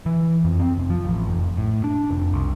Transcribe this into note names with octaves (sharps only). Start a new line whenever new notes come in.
E3
F2
C4
F1
F3
A1
F1
A2
D4
F1
C2